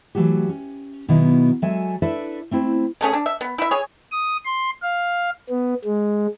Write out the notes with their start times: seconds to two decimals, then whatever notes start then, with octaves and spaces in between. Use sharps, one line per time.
0.15 E3 F#3 A3 F#4 G4
0.49 C#4
1.08 B2 D#3 F#3 B3 E4
1.62 F#3 G#3 F#4 A4 E5 G#5
2.02 D4 E4 A4 B4 D5 E5
2.51 A3 C4 E4 C5
3.01 C#3 A3 C#4 G#4
3.13 D4
3.26 E5
3.41 B3
3.58 E4 E5
3.71 G#4 C#5
4.12 D#6
4.45 C6
4.82 F5
5.50 B3
5.84 G#3